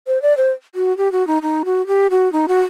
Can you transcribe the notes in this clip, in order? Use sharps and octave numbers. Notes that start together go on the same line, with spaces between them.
C5
D5
C5
F#4
G4
F#4
D#4
D#4
F#4
G4
F#4
D#4
F#4